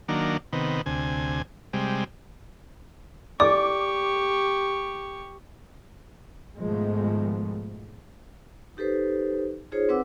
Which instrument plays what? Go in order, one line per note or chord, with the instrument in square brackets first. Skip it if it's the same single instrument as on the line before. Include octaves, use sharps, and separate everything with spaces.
[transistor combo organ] D#3 F#3 A#3 D4
C3 D#3 B3
D2 C3 G#5
C3 G3 G#3
[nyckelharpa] G4 C#6 [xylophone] D5 [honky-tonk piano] D6
[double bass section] G#2 B2 D#3 F3 G#3 A3
[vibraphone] D#4 G4 A4 B4 C5
D#4 F4 G#4 C5 C#5
C4 B4 F#5 D6 E6